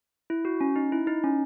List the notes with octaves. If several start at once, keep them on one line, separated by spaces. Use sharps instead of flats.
E4
F#4
C#4
D#4
E4
D#4
C#4